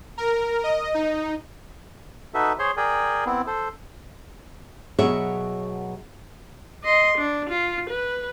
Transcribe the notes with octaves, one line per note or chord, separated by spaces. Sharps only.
A#4
D#5
D#4
D#4 F#4 A4 B4 E5
G#4 C5 C#5 C6
G#4 A#4 D5 G5 G#5
B3 C4 E4
A4 C5
B2 F#3 G#4 B4 C#5 E5
D#5 C6
D4
F4
B4